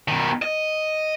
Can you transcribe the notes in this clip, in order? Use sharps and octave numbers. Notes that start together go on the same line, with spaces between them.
B2 D#3
D#5